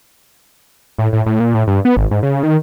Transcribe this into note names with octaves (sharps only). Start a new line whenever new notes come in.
A2
A2
A2
A#2
A2
G2
B3
G#1
G#2
C#3
D#3